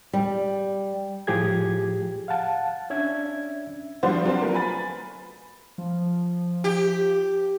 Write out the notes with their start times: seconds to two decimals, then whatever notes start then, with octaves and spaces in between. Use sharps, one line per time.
0.13 G3
1.27 A2 F3 G4 G#4 G#6
2.28 F5 F#5 A5
2.90 C#4 D4 E5 G#6
4.03 F3 G3 D4 E4 F#4 C5
4.25 F#3 B3 C4 D4 F4
4.42 F#3 A3 B3 A#4
4.54 G#5 B5 A6
5.78 F3
6.64 G4